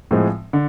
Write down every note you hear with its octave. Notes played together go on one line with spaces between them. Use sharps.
A2 F3 G#3 C4
D3